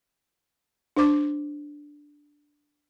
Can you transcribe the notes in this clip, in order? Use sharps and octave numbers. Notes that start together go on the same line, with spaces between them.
D4 C5 D6